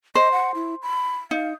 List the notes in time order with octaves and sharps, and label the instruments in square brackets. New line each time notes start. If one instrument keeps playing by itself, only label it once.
[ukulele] C5 [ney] D#5
[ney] F#5
E4
B5
[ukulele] D#4 [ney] F5